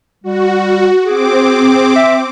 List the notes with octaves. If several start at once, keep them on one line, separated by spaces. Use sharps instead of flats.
G3 F#4
C4 G#4 D6
E5